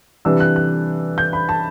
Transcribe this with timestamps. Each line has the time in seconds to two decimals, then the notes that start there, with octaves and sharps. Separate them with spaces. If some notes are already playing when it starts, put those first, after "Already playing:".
0.25 C3 E3 G3 D4 E6
0.40 F#6
0.56 F#6
1.18 G6
1.33 B5
1.49 A5